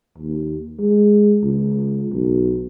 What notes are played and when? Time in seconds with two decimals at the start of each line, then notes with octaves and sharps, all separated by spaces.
0.19 D#2
0.79 G#3
1.44 C#2
2.13 B1